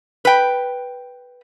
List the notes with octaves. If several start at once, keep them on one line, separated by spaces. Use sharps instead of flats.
B4 G5